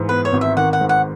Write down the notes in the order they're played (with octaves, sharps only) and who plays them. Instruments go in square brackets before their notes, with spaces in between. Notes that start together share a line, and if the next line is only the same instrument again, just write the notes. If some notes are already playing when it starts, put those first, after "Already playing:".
Already playing: [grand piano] G#2 E3
[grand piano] B3 [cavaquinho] B4
[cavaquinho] C#5
[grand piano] G#1
[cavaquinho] E5
[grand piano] D#3 [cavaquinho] F#5
[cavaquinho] F#5
[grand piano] G#2
[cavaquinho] F#5